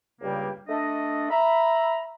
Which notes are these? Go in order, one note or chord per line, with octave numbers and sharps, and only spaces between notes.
C#2 G2 C#3 G3 A#3 G4
A3 D4 D#5
E5 A#5 B5